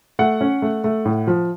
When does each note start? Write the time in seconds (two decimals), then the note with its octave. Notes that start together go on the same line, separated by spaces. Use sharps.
0.19 A3 F#5
0.41 C#4
0.62 A3
0.84 A3
1.05 A2
1.27 F3